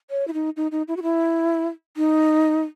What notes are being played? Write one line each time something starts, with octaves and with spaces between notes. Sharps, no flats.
C#5
E4
D#4
D#4
D#4
E4
F#4
E4
D#4